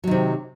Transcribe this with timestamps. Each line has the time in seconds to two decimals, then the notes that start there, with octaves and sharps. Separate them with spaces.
0.04 F#3
0.07 D#3
0.11 C3